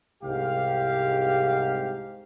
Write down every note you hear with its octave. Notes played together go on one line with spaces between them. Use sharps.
C2 G#2 G4 F5